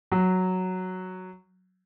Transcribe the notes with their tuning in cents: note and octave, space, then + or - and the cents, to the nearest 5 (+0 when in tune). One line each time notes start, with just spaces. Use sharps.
F#3 +0